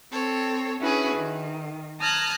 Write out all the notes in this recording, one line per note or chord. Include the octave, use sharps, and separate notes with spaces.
C4 A4 C#5
C#4 D4 E4 F#4 G#4 B4
D#3
A5 A#5 D#6 F6 F#6 G#6